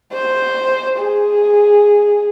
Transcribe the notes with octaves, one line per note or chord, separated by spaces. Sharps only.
C5
G#4